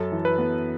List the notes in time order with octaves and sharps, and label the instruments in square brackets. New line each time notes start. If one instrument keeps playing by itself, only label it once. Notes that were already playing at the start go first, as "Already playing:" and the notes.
Already playing: [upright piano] F#2 [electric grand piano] A4
[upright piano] E3
[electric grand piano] B4
[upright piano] B3